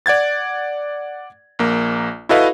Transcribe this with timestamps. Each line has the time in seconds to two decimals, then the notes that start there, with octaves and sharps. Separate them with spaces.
0.06 D5 F#5 G#6 A6
1.59 A#1 A#3
2.29 E4 F#4 A4 B4 D#5 F5